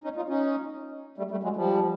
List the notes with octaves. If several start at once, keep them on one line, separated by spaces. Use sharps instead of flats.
C#4 D#4
D#4 F4
C#4 D#4
G3 A3
G3 A3
F#3 G#3
F3 G3